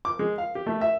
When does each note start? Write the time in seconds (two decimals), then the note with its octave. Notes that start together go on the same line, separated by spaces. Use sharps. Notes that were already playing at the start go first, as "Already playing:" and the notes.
0.05 D6
0.19 G#3
0.38 F5
0.55 G4
0.67 A3
0.81 E5